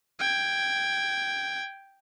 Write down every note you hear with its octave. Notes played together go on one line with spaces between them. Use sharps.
G5 G#6